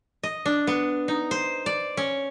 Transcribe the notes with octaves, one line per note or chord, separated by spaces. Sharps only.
D#5
D4
B3
D#4
C5
D5
C#4